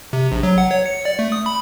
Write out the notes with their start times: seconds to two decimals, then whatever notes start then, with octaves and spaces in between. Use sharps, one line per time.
0.13 C3
0.32 A#1
0.43 F#3
0.58 F#5
0.71 C#5
0.86 C#7
1.05 D5
1.19 A3
1.32 D#6
1.46 B5